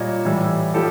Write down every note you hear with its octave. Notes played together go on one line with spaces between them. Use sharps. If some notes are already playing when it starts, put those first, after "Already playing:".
Already playing: A#2 G3 C#5 D#5
A2 E3 G3
A2 F3 G4 A4